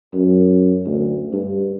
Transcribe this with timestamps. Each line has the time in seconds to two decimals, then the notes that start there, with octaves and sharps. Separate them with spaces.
0.14 F#2
0.86 D2
1.33 G2